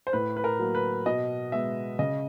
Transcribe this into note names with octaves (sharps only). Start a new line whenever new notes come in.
C5
A2 B4
B4
A#4
F#3 A#3
B4
B2 D#5
G#3 B3 E5
C#3 D#5